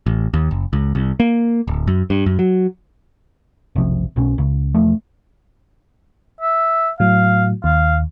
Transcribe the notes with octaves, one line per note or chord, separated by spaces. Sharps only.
A1
D#2
F#1
C#2
C2
A#3
D1
F#2
G2
F#2
F#3
F1 B1 C3 F3
B1 B2 C#4
C#2 C#3
E1 E2 F3 A3
E5
A2 F#3 F5
D#2 F5